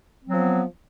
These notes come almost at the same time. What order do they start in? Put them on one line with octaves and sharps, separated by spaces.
C4 F#3 F3 B3